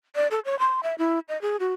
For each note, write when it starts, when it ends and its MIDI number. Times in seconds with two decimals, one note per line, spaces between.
0.15 0.28 74
0.31 0.40 69
0.45 0.58 73
0.59 0.81 84
0.83 0.95 76
0.98 1.19 64
1.29 1.40 75
1.42 1.57 68
1.60 1.74 66